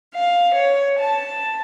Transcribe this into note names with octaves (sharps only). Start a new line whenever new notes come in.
F5
C#5
A5